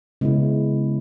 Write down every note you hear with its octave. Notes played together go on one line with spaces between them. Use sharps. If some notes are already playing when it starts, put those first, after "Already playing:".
C#3 G#3 B3 E4